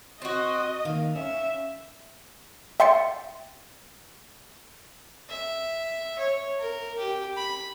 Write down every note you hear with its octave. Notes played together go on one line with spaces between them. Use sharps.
C4 F#4 D#5
D#3 A#3 F5
C#4 E5
E5 G5 C6 A6 C#7
E5
C#5
A#4
G4
B5